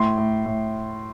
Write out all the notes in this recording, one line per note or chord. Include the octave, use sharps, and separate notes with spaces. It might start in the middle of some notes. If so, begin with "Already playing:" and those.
Already playing: A2 C6
A2
A2